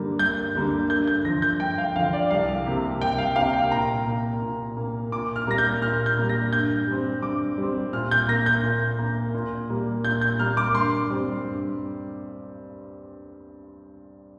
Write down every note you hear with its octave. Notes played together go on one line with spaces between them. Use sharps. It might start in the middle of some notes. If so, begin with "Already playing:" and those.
Already playing: G2 D3 G3 A#3
G2 G6
D3 G3 A#3
G2 G6
G6
D3 F3 A#6
G6
G2 G5
F5
D3 F3 F5
D5
C2 F5
C3 A#3
C2 G5
F5
C3 A#3 F5
G5
A#2 A#5
A#3
A#2
A#3
A#2 D6
F6
G3 A#3 A#6
G6
A#2 F6
G6
G3 A#3
A#6
G2 G6
G3 C4
G2 D6
G3 C4
A#2 F6
G6
A#3 A#6
G6
A#2
A#3
A#2
G3 A#3
A#2 G6
G6
G3 A#3 F6
D6
G2 C6
G3 C4
G2